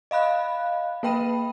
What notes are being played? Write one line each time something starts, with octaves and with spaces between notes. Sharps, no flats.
D#5 F5 B5 F#6
A#3 B4 G5 B5 D#7